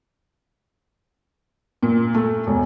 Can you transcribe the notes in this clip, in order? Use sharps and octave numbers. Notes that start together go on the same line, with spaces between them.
A#2
A3
E1